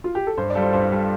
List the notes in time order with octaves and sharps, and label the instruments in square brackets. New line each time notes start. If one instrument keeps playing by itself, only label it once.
[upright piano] F4
G4
A4
[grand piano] G2 [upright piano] C5
[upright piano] D5
[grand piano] G3 F4 A4
[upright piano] C5
[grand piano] G2 [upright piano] C5
[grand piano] G3 F4 A4